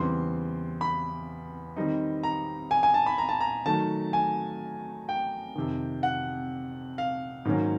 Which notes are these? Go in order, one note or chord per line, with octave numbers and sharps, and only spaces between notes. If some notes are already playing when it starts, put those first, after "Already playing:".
Already playing: E2 C#3 E3 G3 C4 C6
B5
D#3 G3 C4 D#4
A#5
G#5
G#5
A5
B5
A#5
A5
A#5
D#3 F#3 A3 A5
G#5
G5
F2 C3 D#3
F#5
F5
G#2 D#3 F#3 A#3 C#4